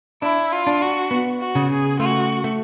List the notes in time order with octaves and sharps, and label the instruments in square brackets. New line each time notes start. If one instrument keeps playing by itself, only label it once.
[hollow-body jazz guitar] D4 [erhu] E4
[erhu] F4
[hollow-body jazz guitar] D4
[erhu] F#4
[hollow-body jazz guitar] B3
[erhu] F#4
[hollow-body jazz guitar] C#3
[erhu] G#4
[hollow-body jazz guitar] A3 [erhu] F#4
[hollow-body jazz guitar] A3